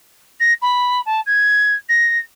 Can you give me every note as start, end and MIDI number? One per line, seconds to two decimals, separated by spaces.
0.40 0.53 94
0.62 1.01 83
1.05 1.20 81
1.26 1.74 92
1.89 2.18 94